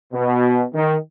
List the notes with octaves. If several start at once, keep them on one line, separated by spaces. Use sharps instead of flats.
B2
D#3